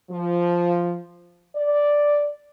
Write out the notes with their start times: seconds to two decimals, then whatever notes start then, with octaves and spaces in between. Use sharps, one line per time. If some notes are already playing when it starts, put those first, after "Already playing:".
0.10 F3
1.56 D5